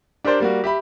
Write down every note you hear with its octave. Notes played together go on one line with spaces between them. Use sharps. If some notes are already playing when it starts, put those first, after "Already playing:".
D4 G4 A#4 C5 D5
G3 A#3 F#4
G4 E5 B5